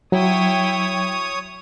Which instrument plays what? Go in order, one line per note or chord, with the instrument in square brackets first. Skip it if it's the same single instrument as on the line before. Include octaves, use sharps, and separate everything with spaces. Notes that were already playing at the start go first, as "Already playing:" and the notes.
[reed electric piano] F#3 [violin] E4 G5 [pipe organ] C#5 D#6